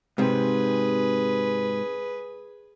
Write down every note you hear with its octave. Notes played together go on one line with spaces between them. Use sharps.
G#2 C3 G#4 B4